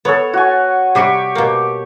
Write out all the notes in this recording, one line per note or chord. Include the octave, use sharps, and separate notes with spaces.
B3 A4 C#5
F#4 G#5
C3 G3 F#4 G4 C#6
B2 A#3